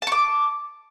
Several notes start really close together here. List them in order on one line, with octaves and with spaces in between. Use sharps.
A5 C#6 D6